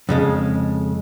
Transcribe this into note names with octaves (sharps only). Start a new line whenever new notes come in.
F2 C#3 G#3